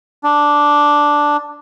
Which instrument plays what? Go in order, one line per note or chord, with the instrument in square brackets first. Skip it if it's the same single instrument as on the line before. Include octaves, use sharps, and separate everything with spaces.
[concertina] D4